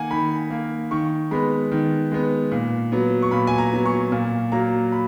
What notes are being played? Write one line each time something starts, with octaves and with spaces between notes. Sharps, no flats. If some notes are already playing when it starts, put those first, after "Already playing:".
Already playing: D#3 A#3 F#5 G#5
D#3 B5
A#3
D#3 C#6
G#3 B3 B5
D#3
G#3 B3
A#2
F#3 B3
C#6
A#2 B5
G#5
A#5
F#3 B3
C#6
A#2
F#3 A#3 A#5
B5